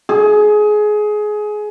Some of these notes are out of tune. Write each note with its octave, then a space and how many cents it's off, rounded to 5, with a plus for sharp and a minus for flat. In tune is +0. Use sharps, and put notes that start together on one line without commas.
G#4 +20